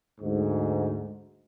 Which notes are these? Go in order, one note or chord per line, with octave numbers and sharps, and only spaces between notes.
D2 G#2